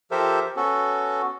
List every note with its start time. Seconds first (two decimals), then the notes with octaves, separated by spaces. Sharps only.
0.11 F3 G4 A4 A#4 C5 E5
0.56 B3 C#4 F#4 A4